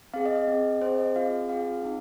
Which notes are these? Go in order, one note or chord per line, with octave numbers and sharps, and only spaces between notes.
C4 G#4 F5
D#5
D#5
C4 G#4
C4 G#4 C5
D#5
C4 F4 G#4 F5
C4 F4 G#4 F5
C4 D#4